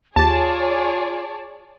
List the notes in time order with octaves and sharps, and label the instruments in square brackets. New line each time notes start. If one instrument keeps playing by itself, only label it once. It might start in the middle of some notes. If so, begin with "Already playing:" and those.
[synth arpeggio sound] D#2 G4 [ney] F4 [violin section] G#4 C#5 D5 [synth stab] A5